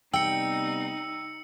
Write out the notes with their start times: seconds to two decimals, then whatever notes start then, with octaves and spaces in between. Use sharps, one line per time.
0.14 C3 G3 B3 D#4 G5 E6 C#7